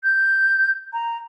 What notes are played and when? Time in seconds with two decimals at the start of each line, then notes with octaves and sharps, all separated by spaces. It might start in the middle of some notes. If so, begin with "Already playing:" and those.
0.03 G6
0.93 A#5